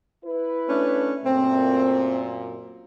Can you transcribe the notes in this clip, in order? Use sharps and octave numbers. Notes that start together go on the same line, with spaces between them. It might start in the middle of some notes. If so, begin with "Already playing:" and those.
E4 B4
A3 C#4 D4
F#2 A#2 A3 C4